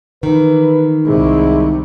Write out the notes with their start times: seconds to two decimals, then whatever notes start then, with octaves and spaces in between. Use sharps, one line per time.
0.23 D#3 E3 B4
1.05 C2 C3 G#3 E4 G#4